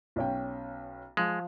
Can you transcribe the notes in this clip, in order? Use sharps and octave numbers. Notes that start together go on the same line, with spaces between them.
B1 C#4 G5
F3 G#3